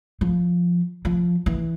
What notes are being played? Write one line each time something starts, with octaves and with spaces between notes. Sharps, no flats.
F3
F3
E3